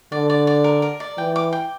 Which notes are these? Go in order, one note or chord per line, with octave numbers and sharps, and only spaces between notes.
D3 D5
D5
D5
A#4
A#4
D5
E3 G5
D6
G5